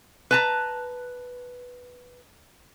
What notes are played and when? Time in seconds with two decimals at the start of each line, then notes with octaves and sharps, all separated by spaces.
0.31 B4 A5 A#5